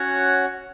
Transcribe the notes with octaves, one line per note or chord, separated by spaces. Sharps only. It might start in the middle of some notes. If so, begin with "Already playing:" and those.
Already playing: C#4 F#4 C#5 F#5